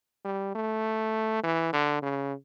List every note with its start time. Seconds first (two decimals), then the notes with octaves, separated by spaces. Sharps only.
0.25 G3
0.55 A3
1.43 E3
1.73 D3
2.02 C#3